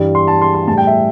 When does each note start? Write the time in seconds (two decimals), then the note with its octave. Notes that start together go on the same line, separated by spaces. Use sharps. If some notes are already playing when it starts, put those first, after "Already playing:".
Already playing: G2 E3 G3
0.15 C6
0.27 A5
0.41 C6
0.54 C6
0.67 A2 A5
0.72 G3
0.77 G5
0.87 E5